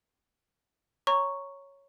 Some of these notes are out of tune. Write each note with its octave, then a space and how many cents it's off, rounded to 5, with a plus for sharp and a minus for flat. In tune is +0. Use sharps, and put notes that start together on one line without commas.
C#5 +0 A#5 +0 C#6 +0